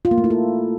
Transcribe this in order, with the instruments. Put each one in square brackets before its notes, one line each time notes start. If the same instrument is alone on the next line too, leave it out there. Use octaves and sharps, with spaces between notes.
[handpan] F4
A#3
A3
E4
A4